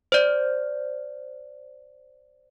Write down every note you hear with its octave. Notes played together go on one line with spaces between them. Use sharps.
C5 D5